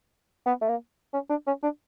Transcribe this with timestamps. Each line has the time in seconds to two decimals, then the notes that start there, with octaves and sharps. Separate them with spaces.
0.46 B3
0.62 A3
0.69 A#3
1.14 C#4
1.30 D4
1.47 C#4
1.63 D4